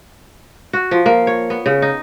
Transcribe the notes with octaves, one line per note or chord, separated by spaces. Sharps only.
F#4
F3
A#3
C#5
B3
C#3
D#4